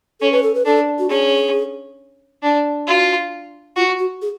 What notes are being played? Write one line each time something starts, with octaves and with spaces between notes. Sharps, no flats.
C#4 A4
B4
A4
B4
D4 A4
F#4
C#4 G#4
D4
F4 F#4
F4 F#4
F#4
G#4